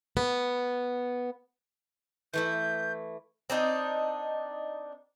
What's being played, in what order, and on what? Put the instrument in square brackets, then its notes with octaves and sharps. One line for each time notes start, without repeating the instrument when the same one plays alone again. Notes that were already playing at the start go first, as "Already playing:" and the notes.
[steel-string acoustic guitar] B3
[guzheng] E3 A3 E4 [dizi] G6
[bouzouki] C4 D4 D#4